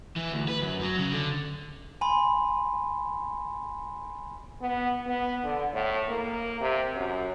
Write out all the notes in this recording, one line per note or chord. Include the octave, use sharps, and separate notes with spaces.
E3
D2
B4
F#2
F#3
C#3
D3
G#5 B5 C6
B3
B3
D3
A2
A#3
C3
F#2